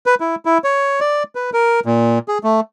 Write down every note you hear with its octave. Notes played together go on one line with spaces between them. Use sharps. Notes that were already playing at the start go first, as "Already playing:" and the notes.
B4
E4
E4
C#5
D5
B4
A#4
A#2
G#4
A3